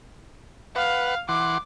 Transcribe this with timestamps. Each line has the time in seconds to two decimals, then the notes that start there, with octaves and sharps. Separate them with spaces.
0.76 B4 F5 F#5
1.29 E3 F#5 C6 D6